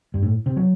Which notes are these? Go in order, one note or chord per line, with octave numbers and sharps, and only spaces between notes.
G2
A2
C3
F#3